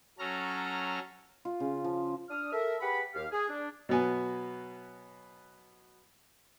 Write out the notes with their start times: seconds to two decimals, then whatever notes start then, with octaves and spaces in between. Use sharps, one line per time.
0.19 F#3 C#4 A4 A#5 F6
1.45 F4
1.60 C#3
1.84 F3
2.29 D4 D#6 F6
2.52 A4 A#4 E5
2.81 G4 G#4 B4 F#5 B5
3.15 D#2 G4 F5
3.32 G#4
3.49 D4
3.89 B2 F#3 B3 G#5